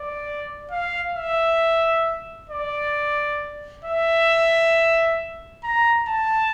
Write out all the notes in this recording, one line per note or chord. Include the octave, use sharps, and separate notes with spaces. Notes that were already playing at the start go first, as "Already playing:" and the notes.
Already playing: D5
F5
E5
D5
E5
A#5
A5